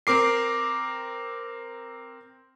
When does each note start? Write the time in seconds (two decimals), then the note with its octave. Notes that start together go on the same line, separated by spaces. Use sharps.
0.07 C4 A#4 D6 C7